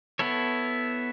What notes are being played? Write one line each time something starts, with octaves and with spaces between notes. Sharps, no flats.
B3 E4 A4 C#5